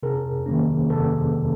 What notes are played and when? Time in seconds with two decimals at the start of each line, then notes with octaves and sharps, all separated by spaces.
0.03 C3 G#4 A#4
0.46 D#3 F#3 A#3 C#4
0.90 C3 A4 B4